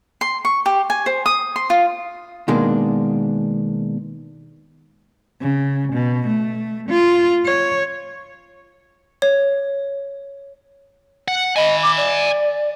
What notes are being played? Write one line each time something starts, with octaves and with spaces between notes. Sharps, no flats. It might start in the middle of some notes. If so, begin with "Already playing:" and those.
C6
C#6
G4
G#5
C5
D#6
C6
F4
B2 D#3 G#3 A#3 D4
C#3
B2
A3
F4
C#5
C#5
F#5
D#5 G#5 B5
D6
D5